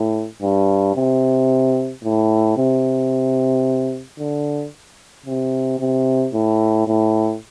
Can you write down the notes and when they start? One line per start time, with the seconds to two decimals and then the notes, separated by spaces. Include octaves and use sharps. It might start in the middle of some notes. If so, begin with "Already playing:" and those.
Already playing: A2
0.42 G2
0.96 C3
2.04 A2
2.57 C3
4.19 D3
5.26 C3
5.80 C3
6.34 A2
6.87 A2